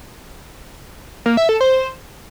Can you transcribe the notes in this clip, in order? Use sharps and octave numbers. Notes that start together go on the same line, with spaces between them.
A#3
E5
A4
C5